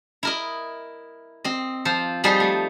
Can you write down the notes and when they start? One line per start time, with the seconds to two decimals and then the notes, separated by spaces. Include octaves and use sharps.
0.23 E4 A#4 D#5
1.44 C4 D#5
1.85 F3 C5
2.24 F3 G3 D#4 G#4 C5 D#5
2.40 A3